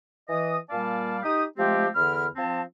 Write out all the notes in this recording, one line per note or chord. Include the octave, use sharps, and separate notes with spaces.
E3 D#5 D#6
A#2 G3 A#3 D5 F5 A5
D#4 G4 D#6
F3 G#3 A3 C4 G4
E2 D3 B5 F6
F3 C4 A5